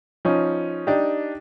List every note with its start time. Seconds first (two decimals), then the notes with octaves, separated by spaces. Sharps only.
0.25 F3 C#4 D#4
0.87 D4 D#4 G4